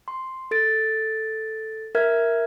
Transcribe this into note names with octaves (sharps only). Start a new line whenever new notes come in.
C6
A4 A6 D7
A#4 E5 F6 G#6